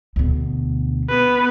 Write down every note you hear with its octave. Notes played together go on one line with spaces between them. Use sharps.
D2 B2
B3 B4